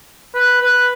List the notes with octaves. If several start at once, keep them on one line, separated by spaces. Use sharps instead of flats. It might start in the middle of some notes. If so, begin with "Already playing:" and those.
B4
B4